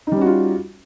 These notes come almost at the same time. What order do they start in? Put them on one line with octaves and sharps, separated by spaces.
D#4 G3 C#4 F#4 F4